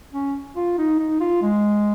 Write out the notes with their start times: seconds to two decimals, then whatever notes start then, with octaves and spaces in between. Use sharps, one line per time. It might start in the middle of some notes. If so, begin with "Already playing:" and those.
0.13 C#4
0.56 F4
0.78 D#4
0.99 D#4
1.20 F4
1.42 G#3